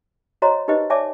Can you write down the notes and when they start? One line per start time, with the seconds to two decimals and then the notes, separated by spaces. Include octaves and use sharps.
0.42 F#4 C5 C#5 D#5 A#5 C6
0.68 D#4 G4 B4 C5 D#5
0.90 C#5 D5 E5 G#5 A5 D6